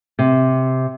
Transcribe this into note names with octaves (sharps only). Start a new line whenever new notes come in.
C3